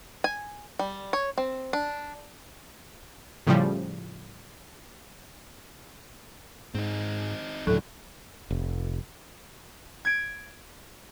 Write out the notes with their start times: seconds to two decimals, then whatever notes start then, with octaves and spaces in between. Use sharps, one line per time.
0.24 G#5
0.79 G3
1.13 C#5
1.38 C4
1.73 D4
3.47 A2 C#3 F3 G3
6.75 G#2 C4 D#4
7.67 D2 A2 C#3 F3 F#3 D4 A4
8.50 F1
10.05 G#6 D7